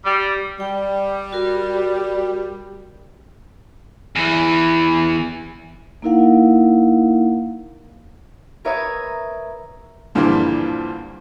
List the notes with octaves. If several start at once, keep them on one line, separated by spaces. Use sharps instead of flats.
G3
G3 G5
F#4 A#4
E2 E3
A#3 D#4 E4 A#4 F5 F#5
A#4 B4 C#5 E5 D#6
G2 A#2 D3 E3 F3 G3